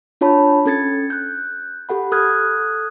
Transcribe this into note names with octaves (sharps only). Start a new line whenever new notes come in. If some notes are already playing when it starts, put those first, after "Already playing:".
D4 F4 C#5 A5 B5
C#4 A4 G#6 A6 C#7
F#6 G6
G4 A4 F#5 B5
A4 D#6 F6 F#6 G#6